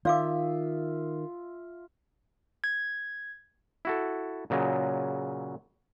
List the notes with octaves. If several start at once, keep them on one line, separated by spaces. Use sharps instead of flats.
D#3 F4 D5 E5 F5 D6
G#6
E4 F#4 A4
A#2 C#3 F#3 D#5